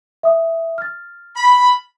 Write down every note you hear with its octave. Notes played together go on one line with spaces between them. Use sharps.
E5 D#6
F6 A6
B5